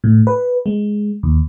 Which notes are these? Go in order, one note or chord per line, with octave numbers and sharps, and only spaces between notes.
A2
B4
G#3
D#2